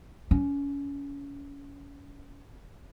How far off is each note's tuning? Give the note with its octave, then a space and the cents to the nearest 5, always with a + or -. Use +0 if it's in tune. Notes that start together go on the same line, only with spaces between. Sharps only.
C#4 +25